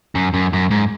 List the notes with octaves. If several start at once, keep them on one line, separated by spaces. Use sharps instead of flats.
F#2
F#2
F#2
G#2